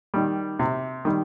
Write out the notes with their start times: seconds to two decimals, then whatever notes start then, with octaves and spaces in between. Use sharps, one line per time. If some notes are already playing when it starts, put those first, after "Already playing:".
0.14 D#3 G3
0.59 C3
1.05 D#3 G3